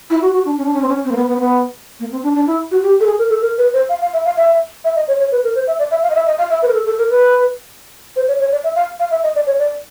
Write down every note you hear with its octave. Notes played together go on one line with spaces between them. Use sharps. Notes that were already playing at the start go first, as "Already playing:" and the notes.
E4
F#4
F#4
D4
C#4
D4
C#4
C4
C#4
C4
A#3
B3
B3
C4
B3
A#3
C4
D4
D4
E4
F#4
G4
A4
G#4
A#4
A4
A#4
B4
C5
F5
F5
E5
F5
E5
E5
D#5
C#5
C#5
B4
A#4
C5
E5
D5
E5
F5
D#5
E5
D#5
F5
E5
B4
A#4
A4
A4
A#4
B4
C5
C#5
C#5
D5
E5
F5
F5
E5
D#5
D5
C#5
D5